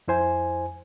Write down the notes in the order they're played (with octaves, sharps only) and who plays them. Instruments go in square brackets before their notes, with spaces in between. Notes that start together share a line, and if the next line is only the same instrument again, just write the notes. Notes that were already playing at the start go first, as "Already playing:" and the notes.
[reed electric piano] F2 E4 C5 G#5